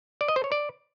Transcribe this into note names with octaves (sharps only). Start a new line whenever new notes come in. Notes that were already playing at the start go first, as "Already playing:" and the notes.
D5
D#5
C5
C#5
D5